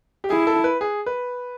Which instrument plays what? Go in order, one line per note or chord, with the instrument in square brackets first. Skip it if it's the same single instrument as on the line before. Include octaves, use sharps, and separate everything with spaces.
[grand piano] G4
[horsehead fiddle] E4 [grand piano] G#4
[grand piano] A4
B4
G#4
B4